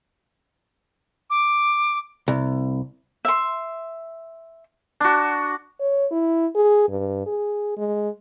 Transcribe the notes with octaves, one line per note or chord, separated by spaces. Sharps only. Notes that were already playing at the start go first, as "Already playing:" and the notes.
D6
C2
E5 C6
D4 F#4
C#5
E4
G#4
G2
G#4
G#3